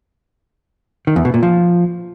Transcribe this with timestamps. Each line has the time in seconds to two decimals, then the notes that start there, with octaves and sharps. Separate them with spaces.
1.07 D#3
1.16 E2
1.25 B2
1.34 A#2
1.43 F3